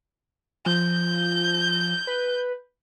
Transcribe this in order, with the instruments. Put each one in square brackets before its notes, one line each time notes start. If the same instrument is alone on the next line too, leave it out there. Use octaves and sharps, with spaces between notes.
[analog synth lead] F3 [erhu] G6
[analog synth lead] B4